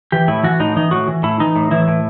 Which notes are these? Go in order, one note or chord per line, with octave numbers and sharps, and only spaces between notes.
E3 G4
A2 E4
E3 F#4
A2 D#4
E3 D#4
A2 F#4
E3
A2 E4
E3 D#4
A2
E3 E4
A2